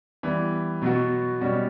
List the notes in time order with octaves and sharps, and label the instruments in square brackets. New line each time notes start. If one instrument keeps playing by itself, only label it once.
[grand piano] E3 G3 B3
B2 F#3 B3 F#4
B2 G3 C#4 F#4